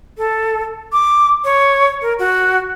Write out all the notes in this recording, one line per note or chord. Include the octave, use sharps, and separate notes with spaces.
A4
D6
C#5
A#4
F#4